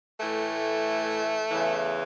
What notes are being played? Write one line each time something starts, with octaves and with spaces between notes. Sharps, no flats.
A2 E3 A3
E2 C#3 E3